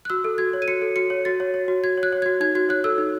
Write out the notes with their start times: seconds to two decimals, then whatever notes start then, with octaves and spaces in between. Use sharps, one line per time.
0.05 F#6
0.10 F#4 E6
0.24 A4
0.38 F#4 G#6
0.53 C#5
0.62 D#7
0.68 F#4 C#7
0.82 A4
0.96 F#4 C#7
1.10 C#5
1.25 F#4 A6
1.40 C#5
1.54 C#5
1.68 F#4
1.84 F#4 G#6
1.97 C#5
2.03 F#6
2.13 C#5
2.22 F#4 G#6
2.40 D#4 G#6
2.55 F#4 G#6
2.69 C#5 F#6
2.84 A4 E6
2.98 D#4